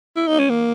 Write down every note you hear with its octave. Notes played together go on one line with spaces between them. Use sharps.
E4
D#4
C#4
A#3